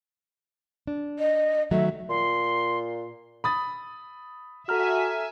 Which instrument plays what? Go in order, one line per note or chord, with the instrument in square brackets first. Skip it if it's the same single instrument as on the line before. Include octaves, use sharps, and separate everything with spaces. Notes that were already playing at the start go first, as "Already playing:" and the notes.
[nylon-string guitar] D4
[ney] D#5
[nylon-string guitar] D#3 F#3 A3 [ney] E5
[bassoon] A#2 [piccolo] C6
[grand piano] B5 D#6 A6
[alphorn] F#4 [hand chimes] A4 A#5 F6 [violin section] E5 G#5